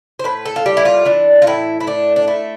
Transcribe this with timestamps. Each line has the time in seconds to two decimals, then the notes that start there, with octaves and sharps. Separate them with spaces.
0.19 C5
0.24 A2 B4
0.45 A4
0.56 F4
0.66 G3 G4
0.77 E4
0.85 F4
1.05 E3 D4
1.42 F4
1.47 A2 E4
1.80 E4
1.87 A3 D4
2.16 D4
2.27 A3 E4